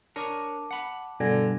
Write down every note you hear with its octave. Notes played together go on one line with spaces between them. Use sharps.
D4 A#4 C#5 A5 D6
F#5 B5
G2 B2 D3 G#5 G#6 A#6